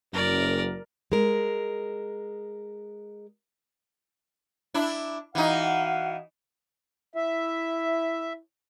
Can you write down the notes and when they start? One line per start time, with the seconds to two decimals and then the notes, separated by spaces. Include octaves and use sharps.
0.13 F#1 F#2 A#4 D5
1.12 G#3 A#4
4.74 D4 E4
5.35 E3 D#4 F#4 F5 F#5
7.15 E4 E5